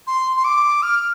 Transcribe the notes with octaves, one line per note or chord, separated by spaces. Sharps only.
C6
C6
D6
F6